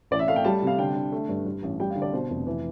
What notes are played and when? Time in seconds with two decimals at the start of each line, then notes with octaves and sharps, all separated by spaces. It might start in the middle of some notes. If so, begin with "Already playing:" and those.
0.11 A1 D5
0.19 E5
0.28 A3 F5
0.36 G5
0.45 G3 A5
0.62 C3 F5
0.78 D3 G5
0.95 D3
1.12 A3
1.29 G2
1.46 G2
1.63 A1
1.80 G3 G5
1.90 F5
1.96 D3
2.02 D5
2.13 B2 C5
2.30 F1
2.47 E3